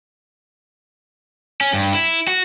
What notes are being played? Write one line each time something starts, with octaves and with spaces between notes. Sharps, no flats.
C#4
G2
E4
F#4